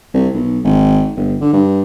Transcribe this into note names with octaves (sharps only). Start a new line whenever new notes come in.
C2
B1
G#1
G1
D3
G2